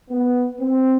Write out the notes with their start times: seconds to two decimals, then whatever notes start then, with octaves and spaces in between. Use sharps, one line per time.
0.10 B3
0.60 C4